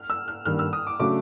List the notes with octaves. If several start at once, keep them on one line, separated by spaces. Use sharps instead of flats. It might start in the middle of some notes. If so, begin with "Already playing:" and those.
Already playing: F6
E6
F6
G2 D#3 G3 A#3 F6
E6
D#6
D6
C#3 F#3 A3 D4 D6